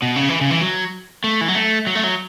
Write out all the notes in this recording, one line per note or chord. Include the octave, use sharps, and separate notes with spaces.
B2
C#3
E3
C#3
E3
F#3
A3
E3
F#3
A3
F#3
A3
F#3